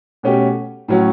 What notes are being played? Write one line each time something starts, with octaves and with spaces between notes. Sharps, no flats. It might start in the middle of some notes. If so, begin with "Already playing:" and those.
B2 A3 C#4 G4
A2 F#3 C#4